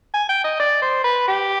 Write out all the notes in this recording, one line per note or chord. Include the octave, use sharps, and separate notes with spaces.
G#5
G5
D#5
D5
C5
B4
G4